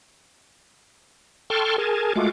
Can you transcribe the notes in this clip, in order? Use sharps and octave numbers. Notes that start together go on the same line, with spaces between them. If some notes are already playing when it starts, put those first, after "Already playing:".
A4 G5 A5 C6 C#6 F6
G#4 A#4 G#5 A5
G#3 A3 F4 F#4 D6